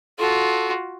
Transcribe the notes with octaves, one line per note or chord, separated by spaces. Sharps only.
F4 F#4 A4